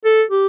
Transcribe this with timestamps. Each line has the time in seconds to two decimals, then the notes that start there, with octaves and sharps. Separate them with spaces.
0.05 A4
0.31 G4